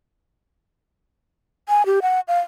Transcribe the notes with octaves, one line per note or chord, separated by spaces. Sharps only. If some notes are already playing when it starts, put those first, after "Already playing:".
G#5
G4
F#5
F5